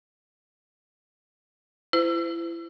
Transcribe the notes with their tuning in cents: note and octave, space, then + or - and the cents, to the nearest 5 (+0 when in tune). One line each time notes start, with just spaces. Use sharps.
E4 +30 C5 -40